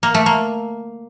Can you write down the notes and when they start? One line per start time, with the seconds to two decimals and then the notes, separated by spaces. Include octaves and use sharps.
0.03 A#3
0.14 A3
0.26 A#3